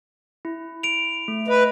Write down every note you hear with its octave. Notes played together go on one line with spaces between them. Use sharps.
E4
D7 F7
A3
B4 D#5